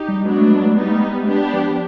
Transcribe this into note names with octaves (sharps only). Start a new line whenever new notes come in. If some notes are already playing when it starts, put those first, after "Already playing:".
Already playing: D#4 G4
G3
F#3 G#3 B3 D4
A3
G#3
A3
G3 G#3 B3 D#4
A3
G#3
A3
G#3 B3 D4 G4
F3
F3